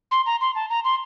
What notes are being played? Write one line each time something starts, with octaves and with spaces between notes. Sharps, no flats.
C6
A#5
C6
A5
A#5
C6